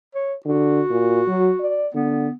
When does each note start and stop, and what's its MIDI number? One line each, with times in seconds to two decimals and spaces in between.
0.15 0.34 73
0.46 0.81 50
0.46 1.84 66
0.90 1.21 46
1.28 1.51 54
1.60 1.88 74
1.94 2.28 50
1.94 2.33 59